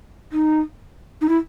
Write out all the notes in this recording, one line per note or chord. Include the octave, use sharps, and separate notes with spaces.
D#4
D#4
E4